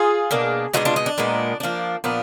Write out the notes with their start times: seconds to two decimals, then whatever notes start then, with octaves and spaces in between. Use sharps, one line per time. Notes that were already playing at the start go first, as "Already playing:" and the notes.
Already playing: F4 G#4
0.31 B2 A#3 D4
0.74 B2 G#3 D4 D#4 F#4
0.85 D4 F4
0.96 D#4
1.06 D4
1.18 A#2 G#3 B3
1.60 F3 A#3 D4
2.04 A#2 F3 B3 D4